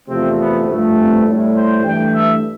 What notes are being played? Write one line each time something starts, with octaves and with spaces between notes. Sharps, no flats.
E2 C3 F3 A3 C4
B3
G2 F3 A3
C4
A2 G3
C5
G2 E3 A3 G5
E5